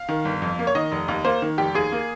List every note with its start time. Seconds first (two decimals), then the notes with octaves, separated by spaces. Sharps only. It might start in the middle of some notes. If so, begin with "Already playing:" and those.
Already playing: F5
0.09 D#3
0.25 G1
0.42 F2
0.59 A#3
0.67 C#5
0.75 D#3 D#5
0.92 F1
1.08 D#2
1.24 A#3 C5
1.42 D#3
1.58 F1 G4
1.74 D#2 G#4
1.92 A#3